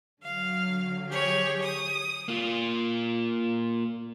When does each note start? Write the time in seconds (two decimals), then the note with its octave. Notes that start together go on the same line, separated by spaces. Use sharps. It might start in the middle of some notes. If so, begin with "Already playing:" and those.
0.21 D3 F#3 F5
1.10 G4 G#4 C#5
1.62 D#6
2.28 A#3 F4